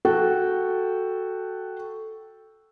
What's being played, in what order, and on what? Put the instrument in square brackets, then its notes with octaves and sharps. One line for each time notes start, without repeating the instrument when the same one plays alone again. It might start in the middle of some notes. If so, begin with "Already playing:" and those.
[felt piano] F#4 A4 G5